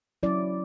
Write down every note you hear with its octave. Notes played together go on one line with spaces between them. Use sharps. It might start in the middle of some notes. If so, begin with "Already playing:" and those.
F#3 C#4 E4 D5